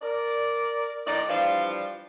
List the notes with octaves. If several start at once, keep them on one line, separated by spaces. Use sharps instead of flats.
A#4 D5
A2 D#3 D#4 D5
E3 F3 G3 D4 F4